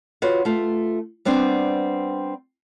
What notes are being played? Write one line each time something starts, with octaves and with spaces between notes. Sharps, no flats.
F4 F#4 B4 C#5
A3 F4
G3 B3 C4 D4